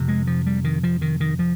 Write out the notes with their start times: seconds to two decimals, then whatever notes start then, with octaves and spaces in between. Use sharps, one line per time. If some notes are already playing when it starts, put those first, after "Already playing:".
Already playing: F2 C3
0.08 G#3
0.27 F3
0.46 G3
0.64 D#3
0.84 F3
1.02 D#3
1.20 D#3
1.39 F3